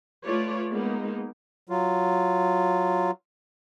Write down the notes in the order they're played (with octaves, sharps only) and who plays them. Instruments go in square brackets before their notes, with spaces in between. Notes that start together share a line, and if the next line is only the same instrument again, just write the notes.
[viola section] A3 F4 B4 C#5 D5
G#3 A#3 B3 D#4
[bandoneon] F#3 F4